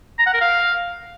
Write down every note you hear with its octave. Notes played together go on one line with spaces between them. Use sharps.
A#5
F#5
A#4
F5